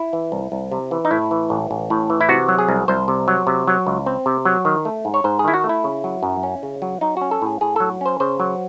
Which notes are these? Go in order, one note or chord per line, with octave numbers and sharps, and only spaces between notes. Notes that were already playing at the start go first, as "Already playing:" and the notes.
Already playing: E4
E3
C2
C2
C3
E3
D#4
A2 E4
E3
A1
A1
A2
E3
E4
C3 F#4
F#3
G#4
C2
C2 C5
C3
F#3
C3
F#3
C#2
C4
C3
F#3
D#3
A3
G#2
C#5
G#2 C5
G#4
D#3 E4
F#4
A3
E4
C#3
F#3
F#2
C#4
C#3
F#3
F#3 D#4
C#4 F#4
A4
A2 G#4
A2 G#4
F#3 A4
C#4 C5
C#3 C5
F#3